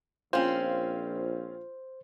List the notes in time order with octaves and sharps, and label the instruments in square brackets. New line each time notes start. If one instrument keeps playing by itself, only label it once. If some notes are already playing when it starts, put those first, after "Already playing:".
[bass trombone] A#1 [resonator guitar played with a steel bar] C4 C#4 [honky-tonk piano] F4 [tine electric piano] C5